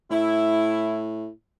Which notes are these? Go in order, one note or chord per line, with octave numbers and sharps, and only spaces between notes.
A2 E4